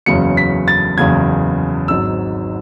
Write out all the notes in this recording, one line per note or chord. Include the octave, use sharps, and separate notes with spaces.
F#1 E2 C#3 F#3 C#7
B6
A6
F#1 E2 C#3 F#3 G#6
G#1 G#2 F#3 E6